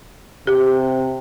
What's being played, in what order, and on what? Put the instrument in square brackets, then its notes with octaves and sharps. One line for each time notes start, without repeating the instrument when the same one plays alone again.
[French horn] C3 [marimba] G4